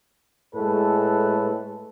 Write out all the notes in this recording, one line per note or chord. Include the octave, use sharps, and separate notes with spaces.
A2 G#3 A4 B4